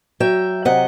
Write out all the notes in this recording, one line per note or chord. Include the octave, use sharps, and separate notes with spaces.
F#3 E5 G5
C3 D#5 F#5